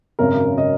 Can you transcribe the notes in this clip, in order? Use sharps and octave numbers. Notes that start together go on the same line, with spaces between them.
G#1 F#2 C#3 A#4
C#3 D#5